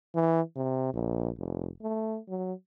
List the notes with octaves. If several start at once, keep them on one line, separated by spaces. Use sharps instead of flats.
E3
C3
A#1
F1
A3
F#3